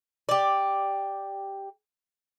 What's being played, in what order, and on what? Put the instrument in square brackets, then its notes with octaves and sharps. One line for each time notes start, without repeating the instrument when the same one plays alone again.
[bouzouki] G4 D5